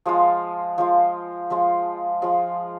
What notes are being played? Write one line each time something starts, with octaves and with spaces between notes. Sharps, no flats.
F3 G#3 F4
F3 G#3 F4
F3 G#3 F4
F3 G#3 F4